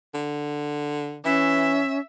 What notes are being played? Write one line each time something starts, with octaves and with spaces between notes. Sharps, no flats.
D3
E3 C#4 E5